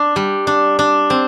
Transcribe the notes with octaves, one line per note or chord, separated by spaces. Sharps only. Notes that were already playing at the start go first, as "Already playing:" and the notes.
Already playing: D4
G3
D4
D4
C4